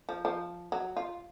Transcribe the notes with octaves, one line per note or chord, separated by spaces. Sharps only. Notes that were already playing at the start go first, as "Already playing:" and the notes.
F3
F3
F#3
F4